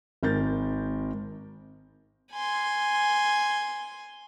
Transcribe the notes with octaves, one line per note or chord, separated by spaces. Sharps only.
G#1 A#4 G6 A6
G#5 C6